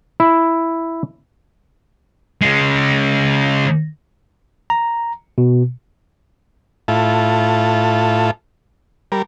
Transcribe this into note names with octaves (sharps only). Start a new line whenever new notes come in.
E4
C#3 G#3
A#5
B2
A2 E4 F4 A4
G3 A#4